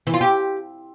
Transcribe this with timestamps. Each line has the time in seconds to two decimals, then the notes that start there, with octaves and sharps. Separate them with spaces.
0.07 E3
0.14 F4
0.21 G4